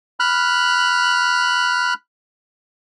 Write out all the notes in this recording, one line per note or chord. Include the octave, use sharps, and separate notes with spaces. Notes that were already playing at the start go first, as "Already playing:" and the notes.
B5 F6 F#6